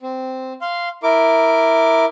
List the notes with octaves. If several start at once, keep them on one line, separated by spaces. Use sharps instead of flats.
C4
F5 C6
E4 A#4 D6